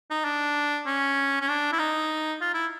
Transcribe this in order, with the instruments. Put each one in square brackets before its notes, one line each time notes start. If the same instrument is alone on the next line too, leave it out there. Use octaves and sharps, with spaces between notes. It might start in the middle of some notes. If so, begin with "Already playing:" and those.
[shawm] D#4
D4
C#4
C#4
D4
E4
D#4
F4
E4